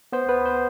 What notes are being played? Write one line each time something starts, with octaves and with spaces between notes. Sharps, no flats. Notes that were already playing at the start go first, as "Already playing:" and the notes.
B3 C5
B3 B4
C5